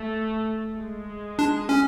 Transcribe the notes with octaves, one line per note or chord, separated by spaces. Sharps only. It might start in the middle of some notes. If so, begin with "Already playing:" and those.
Already playing: A3
G#3
D4
C#4